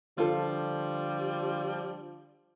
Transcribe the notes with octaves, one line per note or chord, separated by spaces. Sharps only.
D3 F3 G3 F4 A4